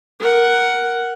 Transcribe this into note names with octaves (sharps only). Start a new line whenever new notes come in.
A#4 F#5